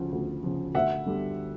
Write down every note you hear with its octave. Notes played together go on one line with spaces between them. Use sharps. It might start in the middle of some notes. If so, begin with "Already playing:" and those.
Already playing: D2 C#3 F3
D2
C#3 F3
D2 E5 F#5
D3 G3